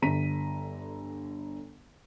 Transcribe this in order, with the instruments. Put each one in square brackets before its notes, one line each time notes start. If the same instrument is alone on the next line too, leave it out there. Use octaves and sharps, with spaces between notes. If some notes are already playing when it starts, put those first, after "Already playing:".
[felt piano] G1 D3 A#5 B6 D#7